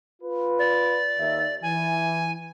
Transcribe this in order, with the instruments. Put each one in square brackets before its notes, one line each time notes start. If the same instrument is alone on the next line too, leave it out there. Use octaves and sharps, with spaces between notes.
[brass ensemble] F4 B4
[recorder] D5
[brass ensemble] D#2 D#3 E5
[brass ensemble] E3 [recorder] G#5